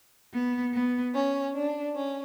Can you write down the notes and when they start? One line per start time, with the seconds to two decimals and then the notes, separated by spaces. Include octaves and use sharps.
0.32 B3
0.72 B3
1.13 C#4
1.54 D4
1.95 C#4